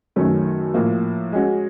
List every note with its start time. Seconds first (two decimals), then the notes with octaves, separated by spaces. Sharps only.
0.16 F#2 D#3 F#3 A3 C#4
0.74 A2 F3 A#3
1.32 G#3 C#4 F#4